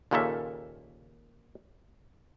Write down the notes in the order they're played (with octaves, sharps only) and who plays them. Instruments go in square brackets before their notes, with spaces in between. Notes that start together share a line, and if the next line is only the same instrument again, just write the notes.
[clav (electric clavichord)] D#2 A#2 C#3 A#3 A4 E5